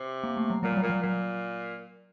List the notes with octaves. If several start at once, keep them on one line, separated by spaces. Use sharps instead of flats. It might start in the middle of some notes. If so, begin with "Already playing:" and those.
Already playing: C3
A#3
A3
F#3
A#2 F#3
G3
F#3
A#2
F#3
A#2 F#3